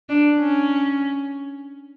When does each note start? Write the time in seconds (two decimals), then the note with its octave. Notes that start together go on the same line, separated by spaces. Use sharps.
0.09 D4
0.40 C#4